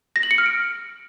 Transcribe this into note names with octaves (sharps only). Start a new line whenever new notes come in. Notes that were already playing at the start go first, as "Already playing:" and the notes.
A#6
F#7
C#7
F6
D7